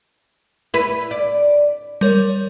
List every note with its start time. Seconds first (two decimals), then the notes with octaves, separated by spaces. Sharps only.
0.74 E4 B4
1.11 D5
2.01 G3 A#4 C#5